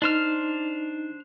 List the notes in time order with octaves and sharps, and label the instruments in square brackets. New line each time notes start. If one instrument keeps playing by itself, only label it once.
[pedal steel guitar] D4 C5 F6 [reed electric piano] D#4